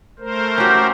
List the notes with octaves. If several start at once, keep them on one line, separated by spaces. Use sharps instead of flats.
A3 A#4 C5
C#4 F#4 G4